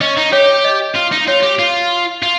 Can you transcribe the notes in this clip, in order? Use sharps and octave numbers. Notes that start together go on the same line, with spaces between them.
C#4 D#5
D#4
G4 C#5
D#5
F4
D#4
F4 C#5
G4
F4
F4